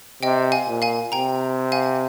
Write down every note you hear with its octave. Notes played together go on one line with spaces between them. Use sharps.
C3 D#5 G5
F5 G#5
A#2
F5 G#5
C3 G5 A#5
F5 G#5